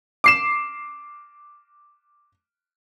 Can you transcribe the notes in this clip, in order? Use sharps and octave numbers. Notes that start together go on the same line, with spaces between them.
D6 C7 E7